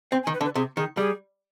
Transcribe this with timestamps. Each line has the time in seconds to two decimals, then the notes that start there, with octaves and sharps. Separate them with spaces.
0.12 C4 G5
0.23 G#5
0.27 D#3
0.34 B4
0.41 D3
0.44 B4
0.55 C3 G#4
0.77 D#3 G#4
0.97 G3 G#4